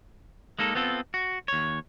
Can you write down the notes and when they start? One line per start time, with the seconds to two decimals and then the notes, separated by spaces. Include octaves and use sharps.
0.59 G#3 A#3 D#4 A4
0.75 B3 C4 F4 A4
1.14 F#4
1.48 D#2 C#5